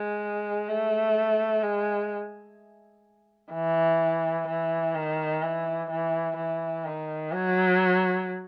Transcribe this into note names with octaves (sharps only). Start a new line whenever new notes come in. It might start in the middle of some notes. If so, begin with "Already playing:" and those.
Already playing: G#3
A3
G#3
E3
E3
D#3
E3
E3
E3
D#3
F#3